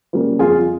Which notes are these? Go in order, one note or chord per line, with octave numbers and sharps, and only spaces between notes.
C#3 G3 A#3
F2 F4 G#4